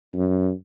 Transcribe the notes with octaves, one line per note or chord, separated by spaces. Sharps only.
F#2